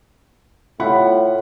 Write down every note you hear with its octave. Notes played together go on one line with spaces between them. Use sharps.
A2 F4 F#5 B5